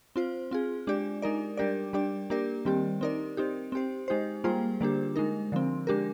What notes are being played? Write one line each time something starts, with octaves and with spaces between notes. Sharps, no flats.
C4 F4 C5
C4 F4 G#4
G#3 D4 G4 D5
G#3 D#4 A#4 D5
G3 D4 G4 A#4 D5
G3 D4 G4 D5
A#3 D4 G4 A#4 D5
D#3 G3 C4 G4
C4 D#4 A#4 D5
C4 D#4 G4
C4 G4 C5
G#3 D#4 G4 C5
G3 A#3 F4 G#4 C5
D3 G3 A#3 D4 G4
G#3 D#4 A#4
D3 F3 C4
G#3 D4 G4 A#4